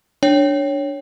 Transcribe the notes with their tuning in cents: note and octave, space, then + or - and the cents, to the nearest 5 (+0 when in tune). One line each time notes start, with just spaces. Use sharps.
D4 +0 C#5 +0 G5 +0